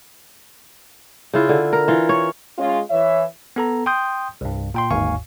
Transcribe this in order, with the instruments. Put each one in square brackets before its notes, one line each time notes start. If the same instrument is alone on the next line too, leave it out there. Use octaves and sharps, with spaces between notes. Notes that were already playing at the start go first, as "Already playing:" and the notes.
[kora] C#3 E4 F4
D3
A#4
E3 F4
C#5
[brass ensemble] G#3 C#4 F4
E3 C#5 E5
[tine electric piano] B3 A4 A#5
G5 C6 D#6 G6
C2 G2
A#2 G5 C6
G1 D#2 G#2 F5 G#5 C#6